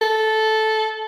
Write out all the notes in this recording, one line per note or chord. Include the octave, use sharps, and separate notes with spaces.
A4